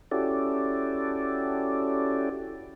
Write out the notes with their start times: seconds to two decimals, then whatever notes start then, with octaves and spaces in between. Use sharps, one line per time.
0.11 C#4 E4 F#4 G4 A4 D5